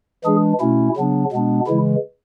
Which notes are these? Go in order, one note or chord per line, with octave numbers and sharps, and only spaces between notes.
E3 G#3 D4 G#4
B2 A3 C#4 E4
C#3 F#3 B3 D4
B2 G#3 B3 D4
C#3 E3 G#3 E4